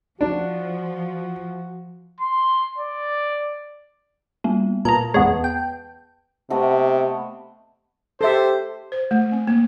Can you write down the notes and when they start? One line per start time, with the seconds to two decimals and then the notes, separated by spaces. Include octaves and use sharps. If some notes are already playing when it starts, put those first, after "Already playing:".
0.21 F3 D4 F#4
2.21 C6
2.78 D5
4.44 G3 A#3 B3
4.85 A#2 A#4 B4 A5 A#5
5.14 E2 G#3 B3 C#5
5.44 G5
6.50 C3 A3 B3 D#5
8.21 G4 A4 C5 E5
8.92 C5
9.11 A3
9.32 C4
9.47 A#3